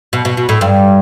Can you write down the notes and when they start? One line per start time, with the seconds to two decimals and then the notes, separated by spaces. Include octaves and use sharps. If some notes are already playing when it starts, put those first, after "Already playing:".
0.13 B2
0.25 B2
0.37 B2
0.49 A2
0.61 G2